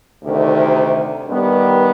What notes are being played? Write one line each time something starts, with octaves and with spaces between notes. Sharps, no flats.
D2 C3 D#3
G2 D#3 G3 B3